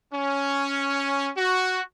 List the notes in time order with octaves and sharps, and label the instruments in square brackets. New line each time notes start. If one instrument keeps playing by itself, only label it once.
[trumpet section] C#4
F#4